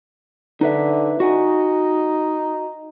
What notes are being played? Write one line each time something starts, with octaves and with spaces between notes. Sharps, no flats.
D3 D#4 B4 E5
D#4 F#4 F#5 G#5